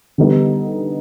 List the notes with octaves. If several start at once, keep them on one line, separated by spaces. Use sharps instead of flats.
D3 G3 B3 D#4